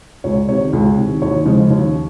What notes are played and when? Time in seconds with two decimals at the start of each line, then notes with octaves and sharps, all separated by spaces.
0.24 C#2 C#5
0.49 C3 D#3 C#5
0.73 C#2
0.97 C3 D#3
1.22 D#2 C#5
1.45 C#3 F3 G#3
1.70 D#2